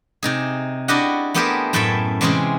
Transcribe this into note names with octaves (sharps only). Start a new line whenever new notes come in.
C3 D#4 G#4
D4 E4 F#4 G4 D#5 F#5
A3 B3 G4 G#4 A#4 C5
F#2 A2 C#4 A4 E5 G5
C3 E3 G#3 C4 C#4 G#4